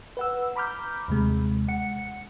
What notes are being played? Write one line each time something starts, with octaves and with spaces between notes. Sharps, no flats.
B4 F#5 E6
A#5 B5 D6 F6 G6
D#2 C3 G#3
F#5 C#7